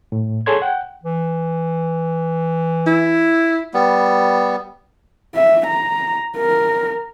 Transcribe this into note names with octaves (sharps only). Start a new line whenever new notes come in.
A2
G#4 A4 C#5 C6 G#6
F#5 G5
E3
E4
G3 B3
E5
A#5
A#4